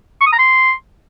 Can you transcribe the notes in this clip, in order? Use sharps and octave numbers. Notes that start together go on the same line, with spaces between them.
C#6
D#6
A#5
C6